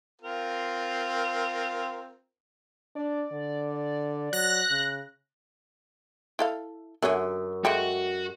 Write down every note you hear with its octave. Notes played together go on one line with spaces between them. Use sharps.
C4 F4 A#4
D4 D5
D3
F#3 F#6 A#6
C#3
E4 A4 F5
F#2 D3 F#3 C#4
G#3 A3 F#4 G4